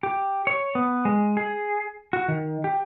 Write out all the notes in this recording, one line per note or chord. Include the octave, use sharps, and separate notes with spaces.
G4
C#5
B3
G#3
G#4
F#4
D#3
G4